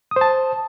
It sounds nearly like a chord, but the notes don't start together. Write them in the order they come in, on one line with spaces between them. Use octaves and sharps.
D#6 C5 A5